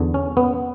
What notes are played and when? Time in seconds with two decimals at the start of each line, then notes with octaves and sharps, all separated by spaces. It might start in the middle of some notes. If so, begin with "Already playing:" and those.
Already playing: E2 D3
0.14 C#4
0.37 B3